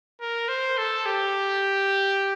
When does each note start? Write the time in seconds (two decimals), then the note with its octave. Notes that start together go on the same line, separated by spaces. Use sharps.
0.21 A#4
0.49 C5
0.78 A4
1.06 G4